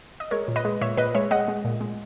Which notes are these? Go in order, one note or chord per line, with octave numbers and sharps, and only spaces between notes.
D#5
G#3 A#4 C#5
A#2
B4 D#5
G#3
A#2 C#5 E5
A#2 B4 D#5
G#3 C#5 E5
G#3 D#5 F#5
G#3
A#2
G#3